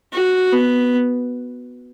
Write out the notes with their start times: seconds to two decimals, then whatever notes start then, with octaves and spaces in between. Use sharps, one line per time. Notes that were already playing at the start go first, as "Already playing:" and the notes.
0.13 F#4
0.53 B3